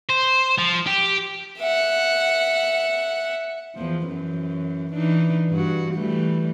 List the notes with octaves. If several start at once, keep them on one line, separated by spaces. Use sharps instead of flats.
C5
F3
G4
E5 F#5
E2 F3
F#2 E3
E3 D4 D#4
G2 F#4
E3 G3 A3